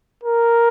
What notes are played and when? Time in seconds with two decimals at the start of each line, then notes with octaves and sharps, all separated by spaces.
0.23 A#4